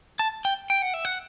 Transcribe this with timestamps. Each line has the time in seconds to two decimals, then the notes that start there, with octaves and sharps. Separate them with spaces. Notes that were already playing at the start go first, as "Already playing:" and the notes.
0.19 A5
0.45 G5
0.70 G5
0.82 F#5
0.94 E5
1.05 F#5